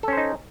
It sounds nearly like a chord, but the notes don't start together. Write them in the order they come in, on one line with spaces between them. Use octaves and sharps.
A4 C#4 C5 D#4